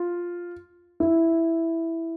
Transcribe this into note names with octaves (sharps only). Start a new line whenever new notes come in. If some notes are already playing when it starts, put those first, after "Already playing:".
Already playing: F4
E4